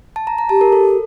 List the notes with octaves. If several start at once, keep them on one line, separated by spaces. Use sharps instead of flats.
A5
A#5
A#5
G4 A5
A#4
A4